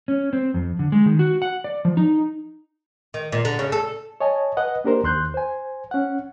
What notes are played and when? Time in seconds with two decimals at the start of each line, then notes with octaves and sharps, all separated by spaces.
0.08 C#4
0.33 C4
0.54 F2
0.79 D3
0.92 G#3
1.06 D#3
1.19 F#4
1.42 F#5
1.64 D5
1.85 F3
1.97 D#4
3.14 D#3
3.32 A#2
3.45 D3
3.59 C#3
3.72 A4
4.20 C#5 D#5 G#5 A5
4.57 B4 D#5 F#5
4.84 A#3 D4 G4 A#4 C5
5.04 D#2 C6 F#6 G6
5.34 C5 G#5
5.91 C#4 F#5